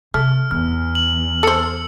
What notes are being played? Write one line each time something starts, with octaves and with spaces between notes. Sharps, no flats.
C3 A3 F6
E2 B3 F6
F#7
A4 C5 E6 C#7 F#7